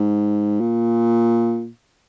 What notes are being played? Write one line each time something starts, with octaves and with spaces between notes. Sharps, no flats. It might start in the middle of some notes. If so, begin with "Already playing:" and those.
Already playing: G#2
A#2